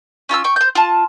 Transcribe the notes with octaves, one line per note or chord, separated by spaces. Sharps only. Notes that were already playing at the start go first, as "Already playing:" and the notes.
C#4 F4 C6 E6
G5 C#6
C5 G6
F4 A5